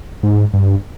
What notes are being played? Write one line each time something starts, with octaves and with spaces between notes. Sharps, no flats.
G#2
G2